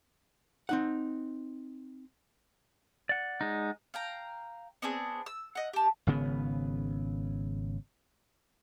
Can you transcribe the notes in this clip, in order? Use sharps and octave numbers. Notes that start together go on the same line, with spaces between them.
C4 D#4 F#5
D5 F#5
G#3 D#4
F5 G5 A#5
B3 C4 D4 G#4
E6
D#5 F#5
G4 A5
G#1 C#3 B3